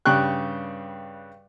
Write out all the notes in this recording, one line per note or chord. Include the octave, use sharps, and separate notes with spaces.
G2 C#3 G3 G5 C#6 F#6